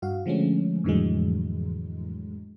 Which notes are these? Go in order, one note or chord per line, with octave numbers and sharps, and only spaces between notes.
G2 F#4 F5
D3 F3 G#3 A3 C#4
F2 A2 D3 E3 F#3 G#3